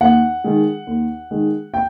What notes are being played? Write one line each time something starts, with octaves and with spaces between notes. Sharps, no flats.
D#2 F#5
D#3 G#3
D#2
D#3 G#3
G5